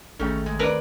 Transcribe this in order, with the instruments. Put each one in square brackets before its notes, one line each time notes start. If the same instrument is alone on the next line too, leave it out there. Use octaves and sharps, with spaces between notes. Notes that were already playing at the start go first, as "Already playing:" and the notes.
[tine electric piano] A1 G#4 G5 [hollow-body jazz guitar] D#2 A3 D#4 [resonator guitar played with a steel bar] C#4
[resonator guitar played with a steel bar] G#3
[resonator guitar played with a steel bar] C4 D5 [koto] A#4 B4